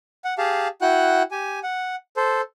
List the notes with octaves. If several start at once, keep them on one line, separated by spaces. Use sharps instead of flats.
F#5
G4 G#4 F5 A5
E4 F#4 F#5 G5 F#6
G4 G#5
F#5
A4 C5